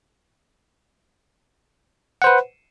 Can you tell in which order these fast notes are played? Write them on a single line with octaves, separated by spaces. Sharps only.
F#5 C5 B4